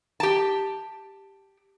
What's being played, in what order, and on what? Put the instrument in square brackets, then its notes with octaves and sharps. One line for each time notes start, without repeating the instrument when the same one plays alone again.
[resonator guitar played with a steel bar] G4 A5